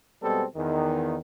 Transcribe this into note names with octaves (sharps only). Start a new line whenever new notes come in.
B2 G3 G#3 B3 C4 A4
E2 D#3